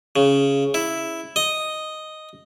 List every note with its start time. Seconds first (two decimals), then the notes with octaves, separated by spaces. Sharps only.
0.16 C#3
0.74 E4
1.36 D#5